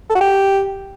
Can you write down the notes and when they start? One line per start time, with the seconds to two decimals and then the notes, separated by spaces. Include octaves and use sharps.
0.10 A4
0.15 F#4
0.21 G4